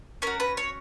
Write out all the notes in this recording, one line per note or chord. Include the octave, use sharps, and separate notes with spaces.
C#4 F#4 A#4
B4
C#5